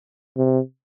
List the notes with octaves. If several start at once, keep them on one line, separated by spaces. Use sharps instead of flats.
C3